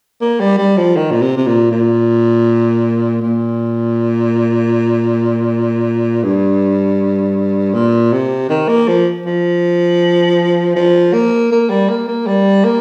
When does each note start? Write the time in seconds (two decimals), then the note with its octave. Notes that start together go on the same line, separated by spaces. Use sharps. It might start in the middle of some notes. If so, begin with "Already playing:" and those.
0.21 A#3
0.40 G3
0.58 G3
0.77 F3
0.97 D#3
1.11 A#2
1.22 C3
1.37 C3
1.47 A#2
1.71 A#2
3.22 A#2
6.23 G2
7.74 A#2
8.12 C3
8.50 D#3
8.69 A#3
8.88 F3
9.26 F3
10.76 F3
11.13 A#3
11.52 A#3
11.70 G3
11.89 A#3
12.08 A#3
12.27 G3
12.65 A#3